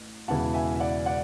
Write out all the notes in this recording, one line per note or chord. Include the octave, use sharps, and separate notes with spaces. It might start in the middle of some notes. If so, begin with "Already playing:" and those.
Already playing: A1
E1 E2 C#3 E3 F#5 A5
E5 G#5
E5
D5 F#5
D5 F#5